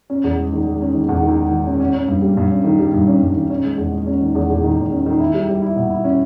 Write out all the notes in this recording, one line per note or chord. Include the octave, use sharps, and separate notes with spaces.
C#4
E2
G#3
D#3
G#3
C#4
D#3
E2
D#3
G#3
D#3
C#4
C#4
C#4
G2
G3
G2
C#4
D#3
G3
G2
C#4
G2
D#3
C#4
G#3
E2
G#3
C#4
D#3
E2
E2
D#3
E2
C#4
D#3
E4
G3
G3
E4
B2
E4
C#4